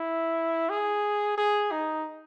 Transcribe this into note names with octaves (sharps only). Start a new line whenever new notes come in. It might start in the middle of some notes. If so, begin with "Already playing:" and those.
Already playing: E4
G#4
G#4
D#4